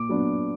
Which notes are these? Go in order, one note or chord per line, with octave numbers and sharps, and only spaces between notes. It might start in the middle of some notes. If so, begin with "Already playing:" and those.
Already playing: A#2 D6
F#3 B3 D4